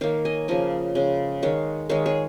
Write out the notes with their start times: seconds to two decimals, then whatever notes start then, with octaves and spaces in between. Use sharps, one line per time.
0.01 D#3 A#3 C#5 F5
0.25 D#5 G#5
0.48 C#3 F3 A#3 D#5 G#5
0.95 C#3 G#3
1.42 D#3 G#3 C#5 F5
1.89 D#3 G#3 C#5 F5
2.06 G#4 C#5